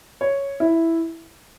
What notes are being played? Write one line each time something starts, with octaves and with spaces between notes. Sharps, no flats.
C#5
E4